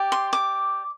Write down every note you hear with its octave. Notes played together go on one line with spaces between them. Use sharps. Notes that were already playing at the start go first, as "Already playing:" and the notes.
Already playing: G4 D5
C6
D6